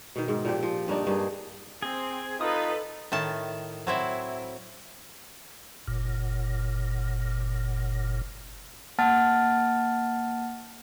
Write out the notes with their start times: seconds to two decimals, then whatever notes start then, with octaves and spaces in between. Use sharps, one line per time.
0.16 B2 D#3
0.28 G#2
0.45 A#2 F3 C4 G4
0.63 F3
0.88 G2 A#3 D4 D#4
1.07 G2 A#3 G#4
1.82 C4 G#4
2.41 D#4 F4 A4 B4 D#5 D#6
3.12 A2 D#3 A5
3.87 F#3 C4 E4
5.88 F#1 A#2
8.99 A#3 F#5 A5 F6 A6